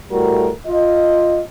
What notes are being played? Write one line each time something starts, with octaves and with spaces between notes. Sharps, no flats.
A2 G3 A3 F#4 A#4
F4 D#5